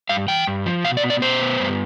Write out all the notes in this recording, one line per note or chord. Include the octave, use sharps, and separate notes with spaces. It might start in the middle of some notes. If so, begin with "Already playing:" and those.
G2 F5
E3 G5
G2
F3
B2 F5
D5
B3
D5
B2 C5
B3
G2